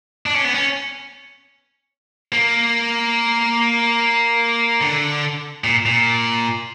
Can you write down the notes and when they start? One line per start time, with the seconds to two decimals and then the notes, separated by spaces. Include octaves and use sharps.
0.26 D4
0.35 C#4
0.44 B3
0.54 C#4
2.33 A#3
4.81 D3
5.64 A#2
5.86 A#2